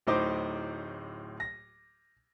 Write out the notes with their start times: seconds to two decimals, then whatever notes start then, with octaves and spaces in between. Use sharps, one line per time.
0.07 D1 A2 D#4 C5 D6
1.40 A#6